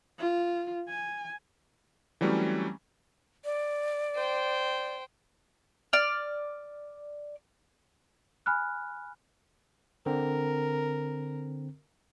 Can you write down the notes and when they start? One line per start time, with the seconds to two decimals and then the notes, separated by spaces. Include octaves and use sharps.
0.18 F4
0.88 G#5
2.21 E3 F#3 G3 A3 C4 C#4
3.44 D5
4.16 C5 G5
5.93 D5 F6
8.46 G#5 B5 F6 F#6
10.06 D3 C4 A#4